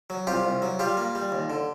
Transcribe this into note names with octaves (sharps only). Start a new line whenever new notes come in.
F#3
C2 F4 G4
C2
F#3
G3 F4 G4
A#3
G3
D#2
D3